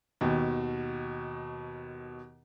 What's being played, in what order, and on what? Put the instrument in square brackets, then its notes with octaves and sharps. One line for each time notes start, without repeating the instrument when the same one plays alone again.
[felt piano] D#2 B2